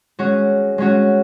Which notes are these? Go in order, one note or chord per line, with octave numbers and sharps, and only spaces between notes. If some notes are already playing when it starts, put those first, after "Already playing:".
G#3 C#4 F#4
G#3 C#4 F#4